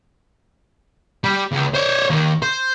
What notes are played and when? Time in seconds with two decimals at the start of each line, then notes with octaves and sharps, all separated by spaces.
1.24 G3
1.53 C#2
1.75 C5 C#5
2.10 D#2 D#3
2.42 C5